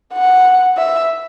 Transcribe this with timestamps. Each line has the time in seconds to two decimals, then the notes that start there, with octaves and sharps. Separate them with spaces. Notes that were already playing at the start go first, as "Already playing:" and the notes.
0.13 F#5
0.77 E5